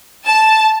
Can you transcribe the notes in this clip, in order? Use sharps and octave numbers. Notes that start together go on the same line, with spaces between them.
A5